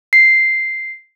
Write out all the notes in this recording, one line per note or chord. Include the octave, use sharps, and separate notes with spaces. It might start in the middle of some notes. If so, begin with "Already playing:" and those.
C7